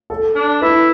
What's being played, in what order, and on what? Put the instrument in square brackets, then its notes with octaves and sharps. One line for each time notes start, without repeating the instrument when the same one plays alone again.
[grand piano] A4
[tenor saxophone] D4
[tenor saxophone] E4 [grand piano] B4